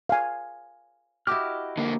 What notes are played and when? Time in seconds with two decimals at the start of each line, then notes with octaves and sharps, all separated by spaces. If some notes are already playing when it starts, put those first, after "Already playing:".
0.09 F5 G#5
1.27 E4 F#4 G4 D#5 D6 F6
1.78 D3 A#3